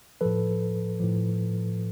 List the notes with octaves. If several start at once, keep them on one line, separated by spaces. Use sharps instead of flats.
A2 F3 A4 B4
A2 F3